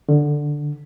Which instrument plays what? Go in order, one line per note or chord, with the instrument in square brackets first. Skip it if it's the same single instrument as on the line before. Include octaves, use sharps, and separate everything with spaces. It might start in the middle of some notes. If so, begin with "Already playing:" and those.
[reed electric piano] D3